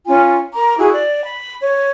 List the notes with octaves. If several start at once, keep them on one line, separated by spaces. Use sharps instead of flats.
C#4 F4 G#5
A#4 A#5 D6
E4 F#4 G#4
D5
B5
C#5